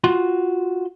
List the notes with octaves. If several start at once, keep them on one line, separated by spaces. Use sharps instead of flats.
F4 F#4 C6